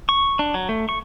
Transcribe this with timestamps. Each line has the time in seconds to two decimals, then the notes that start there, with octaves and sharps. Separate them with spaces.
0.09 C#6
0.39 D4
0.54 F#3
0.69 A3
0.89 C#6